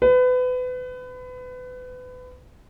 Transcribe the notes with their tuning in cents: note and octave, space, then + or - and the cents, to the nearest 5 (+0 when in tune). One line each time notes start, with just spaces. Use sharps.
B4 +30